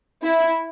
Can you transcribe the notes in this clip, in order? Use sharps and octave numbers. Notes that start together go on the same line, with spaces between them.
E4